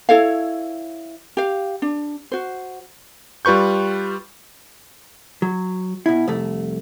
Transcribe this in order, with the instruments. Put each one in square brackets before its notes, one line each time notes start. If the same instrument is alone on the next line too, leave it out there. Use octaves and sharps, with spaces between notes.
[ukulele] E4 A4 C#5 F5
G4 F5
D4
F#4 C5
[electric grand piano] G3 F4 B4 C#6 G6
[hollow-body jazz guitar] F#3
B2 E4
C2 F2 A3